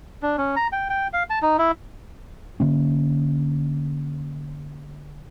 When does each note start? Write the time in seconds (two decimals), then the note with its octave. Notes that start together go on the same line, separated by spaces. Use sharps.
0.23 D4
0.38 C#4
0.56 A#5
0.72 G5
0.90 G5
1.13 F5
1.30 A5
1.42 D#4
1.59 E4
2.60 D3 A#3 C#4